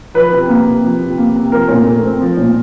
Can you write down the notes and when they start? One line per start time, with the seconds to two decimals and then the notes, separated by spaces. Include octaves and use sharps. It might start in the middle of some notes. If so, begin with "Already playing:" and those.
0.14 F3 B4
0.32 C3
0.49 A#3
0.65 C3
0.83 F3
1.01 C3
1.18 A#3
1.35 C3
1.52 F3 A#4
1.68 A#2
1.86 A3
2.03 C4
2.21 F3
2.37 A#2